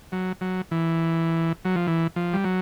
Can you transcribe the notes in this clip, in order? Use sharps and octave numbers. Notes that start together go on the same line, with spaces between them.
F#3
F#3
E3
F#3
F3
E3
F3
G3
F#3